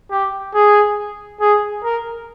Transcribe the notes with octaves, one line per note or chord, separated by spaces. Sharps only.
G4
G#4
G#4
A#4